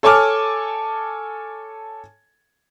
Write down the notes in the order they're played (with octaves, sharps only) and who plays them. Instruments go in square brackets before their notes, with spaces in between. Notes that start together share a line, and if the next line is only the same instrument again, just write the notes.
[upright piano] A4 C#5 G#5 A5 D6 F6